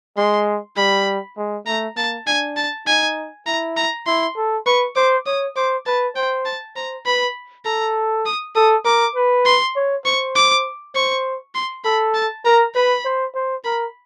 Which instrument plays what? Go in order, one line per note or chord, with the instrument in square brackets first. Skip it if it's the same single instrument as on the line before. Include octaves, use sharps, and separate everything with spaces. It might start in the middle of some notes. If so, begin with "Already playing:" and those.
[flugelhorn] G#3 [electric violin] C6
[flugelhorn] G3 [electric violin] B5
[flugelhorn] G#3
[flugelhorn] A3 [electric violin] A#5
[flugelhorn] A#3 [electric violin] A5
[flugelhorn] D4 [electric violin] G#5
[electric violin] A5
[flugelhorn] D#4 [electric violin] G#5
[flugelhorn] E4 [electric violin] A#5
[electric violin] A#5
[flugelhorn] E4 [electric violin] C6
[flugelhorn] A4
[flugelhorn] B4 [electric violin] C#6
[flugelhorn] C5 [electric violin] D6
[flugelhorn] C#5 [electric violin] D#6
[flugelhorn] C5 [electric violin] D6
[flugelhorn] B4 [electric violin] A5
[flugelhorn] C5 [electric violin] G5
[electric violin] A5
[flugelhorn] C5 [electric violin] A#5
[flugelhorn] B4 [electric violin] B5
[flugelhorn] A4 [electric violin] A#5
[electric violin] D#6
[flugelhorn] A4 [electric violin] D#6
[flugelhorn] A#4 [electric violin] D6
[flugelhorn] B4
[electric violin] C6
[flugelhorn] C#5
[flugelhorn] C5 [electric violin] C#6
[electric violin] D6
[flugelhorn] C5 [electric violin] C#6
[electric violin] C6
[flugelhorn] A4 [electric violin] B5
[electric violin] A5
[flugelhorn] A#4 [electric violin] A#5
[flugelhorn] B4 [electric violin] B5
[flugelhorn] C5
C5
[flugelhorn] A#4 [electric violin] B5